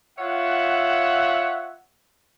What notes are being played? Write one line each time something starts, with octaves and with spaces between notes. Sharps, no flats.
F4 C#5 E5 F#5